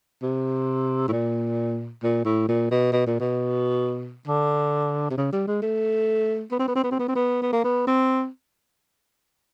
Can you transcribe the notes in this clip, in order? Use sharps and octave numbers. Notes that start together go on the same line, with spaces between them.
C3
A2
A#2
A#2
A2
A#2
B2
B2
A#2
B2
D3
C3
C#3
G3
G#3
A3
B3
C4
B3
C4
B3
C4
B3
C4
B3
B3
A#3
B3
C4